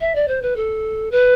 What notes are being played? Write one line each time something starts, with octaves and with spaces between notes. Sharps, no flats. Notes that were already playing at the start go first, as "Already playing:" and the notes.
E5
D5
C5
B4
A4
B4